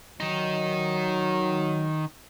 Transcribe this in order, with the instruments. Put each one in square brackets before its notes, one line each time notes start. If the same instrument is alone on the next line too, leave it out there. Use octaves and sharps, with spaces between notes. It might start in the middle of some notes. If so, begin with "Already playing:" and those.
[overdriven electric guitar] D#3 D#4 [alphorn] F#3